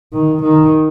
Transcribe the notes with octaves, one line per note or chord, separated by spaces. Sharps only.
D#3
D#3